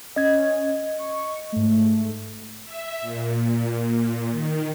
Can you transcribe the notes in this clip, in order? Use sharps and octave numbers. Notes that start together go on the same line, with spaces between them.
C#4 D#5 G#6
C#6
G#2 A3
E5
A#2
D#3